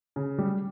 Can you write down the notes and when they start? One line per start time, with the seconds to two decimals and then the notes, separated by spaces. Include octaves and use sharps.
0.16 C#3
0.38 G3